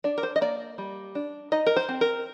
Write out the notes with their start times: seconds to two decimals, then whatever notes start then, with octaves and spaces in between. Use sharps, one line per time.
0.04 D4 D5
0.18 A#4
0.23 C5
0.36 D#5
0.41 A#3 D5
0.78 G3
1.15 D4
1.52 D#4 D#5
1.67 A#4
1.76 C5
1.89 C4
2.01 A#4